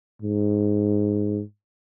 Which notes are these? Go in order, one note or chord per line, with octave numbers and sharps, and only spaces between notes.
G#2